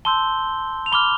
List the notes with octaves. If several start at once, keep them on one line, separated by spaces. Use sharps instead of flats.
A5 C6 E6 G6 G7
F7
B5 D6 F6 G7